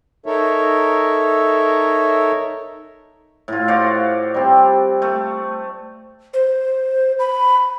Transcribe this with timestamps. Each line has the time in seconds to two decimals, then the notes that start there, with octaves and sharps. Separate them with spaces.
0.26 D#4 A4 A#4 C#5 E5
3.48 A2 F4
3.68 F#4 C5 D5 F5
4.34 G3 C4
5.02 A3
6.33 C5
7.19 B5